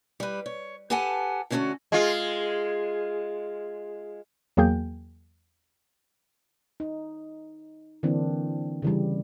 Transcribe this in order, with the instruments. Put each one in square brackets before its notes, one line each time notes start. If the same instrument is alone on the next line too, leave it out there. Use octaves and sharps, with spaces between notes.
[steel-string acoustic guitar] G3 B4
C#5
G4 A4 B4 F#5 G#5 A5
D3 A3 C#4 F4 F#4 A4
[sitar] G#3 F4
[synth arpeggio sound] E2 F#3 A#3 G#4 G5 G6
[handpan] D#4
D3 E3 A#3 C4 D4
C#3 E3 G3